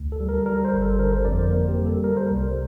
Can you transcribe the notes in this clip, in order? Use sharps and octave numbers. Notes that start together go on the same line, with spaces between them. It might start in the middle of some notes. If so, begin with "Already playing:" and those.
Already playing: D2
A4
G3
A#4
G3 A#4
C5
G1
A4
D3 A#4
C5
F2 D5
C5
A#3 A#4
G4
G3
A4
G3 A#4
C5
C2